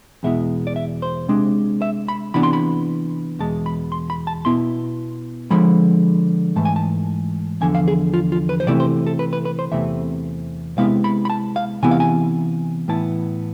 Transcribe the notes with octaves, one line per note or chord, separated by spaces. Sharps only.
E2 B2 G#3 B3 E4 E5
D5
E5
C5
C3 G#3 D4
E5
B5
C3 E3 B3 D4 B5
C6
B5
E2 B2 G#3 A5
B5
C6
B5
A5
B2 B3 E4 C6
D3 F3 G#3 B5
G#2 E3 A3 A5
G#5
A5
E2 D3 F3 G#5
F5
G#4
F4
F4
B4
C5
C3 E3 A3 C4 E4 D5
C5
A4
B4
B4
B4
C5
E2 C3 E3 A3 C4 E5
C3 G#3 B3 E4 F5
B5
B5
A5
F5
C3 E3 B3 E4 G#5
F5
G#5
A2 E3 B3 E4 A5